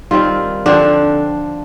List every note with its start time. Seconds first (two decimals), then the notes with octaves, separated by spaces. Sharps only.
0.11 D#3 G3 C4 F4
0.66 D3 F3 C4 D4